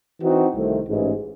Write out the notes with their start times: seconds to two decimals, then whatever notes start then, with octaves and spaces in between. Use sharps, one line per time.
0.21 E3 C4 D#4 F#4
0.54 C2 C3 D#3 A3 C4
0.86 A1 G#2 E3 G#3 C#4